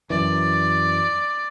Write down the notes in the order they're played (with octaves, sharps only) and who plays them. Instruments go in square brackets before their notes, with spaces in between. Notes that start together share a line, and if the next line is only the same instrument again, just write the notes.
[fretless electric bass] F#2 E3 [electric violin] D5